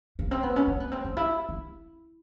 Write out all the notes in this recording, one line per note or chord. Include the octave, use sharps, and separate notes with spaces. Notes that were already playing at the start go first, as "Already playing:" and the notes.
A#3
C4
B3
C#4
C4
B3
C4
C#4
E4
E4